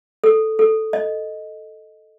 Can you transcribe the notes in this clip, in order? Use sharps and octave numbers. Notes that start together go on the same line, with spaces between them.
A4
A4
D#5